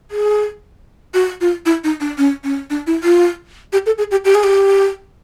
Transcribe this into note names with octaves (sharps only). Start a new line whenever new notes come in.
G#4
F#4
F4
E4
D#4
D4
C#4
C#4
D4
E4
F4
G4
A4
G#4
G4
G4
G#4
G4